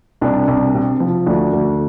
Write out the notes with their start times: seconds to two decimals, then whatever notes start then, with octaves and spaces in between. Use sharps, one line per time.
0.21 C2 D4
0.48 C2
0.74 C3
1.00 F3
1.26 D2 D4
1.53 D2